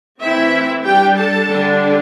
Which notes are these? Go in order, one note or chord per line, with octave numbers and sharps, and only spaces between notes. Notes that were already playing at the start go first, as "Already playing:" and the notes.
E3 A3 C4 E4 E5
G3 D4 G4 G5
A4 A5
D3 G3 D4